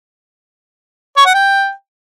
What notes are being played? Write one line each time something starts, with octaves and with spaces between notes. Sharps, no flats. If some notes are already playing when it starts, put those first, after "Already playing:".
C#5
F#5
G5